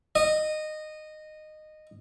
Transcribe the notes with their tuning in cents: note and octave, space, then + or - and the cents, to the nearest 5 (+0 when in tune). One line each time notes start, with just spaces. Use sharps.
D#5 -15